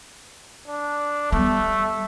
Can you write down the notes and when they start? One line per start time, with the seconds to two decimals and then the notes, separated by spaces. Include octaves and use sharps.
0.68 D4
1.32 G3 A3 B3